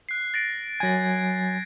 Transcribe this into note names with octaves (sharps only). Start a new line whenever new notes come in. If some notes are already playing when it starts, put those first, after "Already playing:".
F#6 C7
A6 A#6 D7
F#3 G#5 G#6 A#6